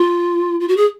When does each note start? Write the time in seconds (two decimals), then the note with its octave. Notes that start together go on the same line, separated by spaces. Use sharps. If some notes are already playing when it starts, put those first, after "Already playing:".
Already playing: F4
0.60 F4
0.68 F#4
0.77 G#4